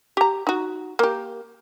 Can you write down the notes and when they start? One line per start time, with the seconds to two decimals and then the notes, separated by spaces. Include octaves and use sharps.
0.17 G4 A#5
0.47 D#4 F#4
0.99 A#3 G4